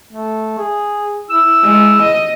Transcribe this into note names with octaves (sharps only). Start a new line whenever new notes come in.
A3
G#4
E4 E6
G#3
D#5